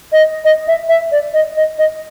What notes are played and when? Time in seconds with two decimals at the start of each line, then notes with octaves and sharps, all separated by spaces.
0.12 D#5
0.45 D#5
0.67 E5
0.89 E5
1.12 D5
1.33 D#5
1.56 D#5
1.78 D#5